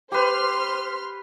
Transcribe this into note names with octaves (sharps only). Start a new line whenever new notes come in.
G4 B4 C5 C6 F6